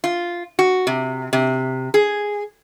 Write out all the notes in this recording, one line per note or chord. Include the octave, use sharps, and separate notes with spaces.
F4
F#4
C3
C3
G#4